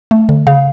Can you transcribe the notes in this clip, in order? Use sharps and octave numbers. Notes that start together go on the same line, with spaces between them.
A3
D3
C#3 F5